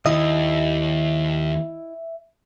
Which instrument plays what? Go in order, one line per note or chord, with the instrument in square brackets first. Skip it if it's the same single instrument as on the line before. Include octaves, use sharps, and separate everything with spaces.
[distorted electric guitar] D#2 [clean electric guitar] E4 D#5 [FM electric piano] E5